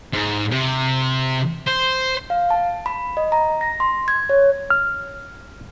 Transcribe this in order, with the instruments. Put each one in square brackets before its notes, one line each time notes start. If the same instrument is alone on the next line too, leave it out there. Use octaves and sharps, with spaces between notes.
[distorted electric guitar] G#2
C3
C5
[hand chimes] F5
A5
B5
D#5
A#5
A#6
C6
G#6
C#5
[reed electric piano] F6